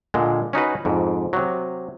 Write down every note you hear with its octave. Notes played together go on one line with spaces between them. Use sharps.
A#2 D3 G#3
C#4 D#4 F#4 B4
F2 G#2
C3 F#3